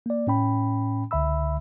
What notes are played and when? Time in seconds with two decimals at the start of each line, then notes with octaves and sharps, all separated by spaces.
0.06 A#3 D5
0.27 A2 C#4 G5 B5
1.11 C#2 D3 E5 B5 E6